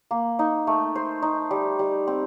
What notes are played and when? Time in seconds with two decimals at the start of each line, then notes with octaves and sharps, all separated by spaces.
0.11 A#3
0.39 D#4
0.67 A3
0.95 C5
1.22 D#4
1.51 G3
1.79 G3
2.07 C4